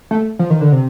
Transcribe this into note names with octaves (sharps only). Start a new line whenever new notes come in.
A3
F3
D#3
D3
C3